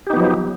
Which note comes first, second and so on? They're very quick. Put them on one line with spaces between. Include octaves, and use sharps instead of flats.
G4 D#4 B3 F3 F#3